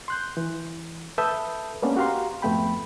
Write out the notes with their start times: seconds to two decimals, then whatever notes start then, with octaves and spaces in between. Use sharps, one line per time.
0.08 C6 F#6 G6
0.37 E3
1.18 A4 B4 E5 A5 D#6 G6
1.82 G#3 A#3 B3 C#4 D4
1.97 F#4 G4 F5 A#5 C6
2.42 F2 G#2 A3 B3 G5 B5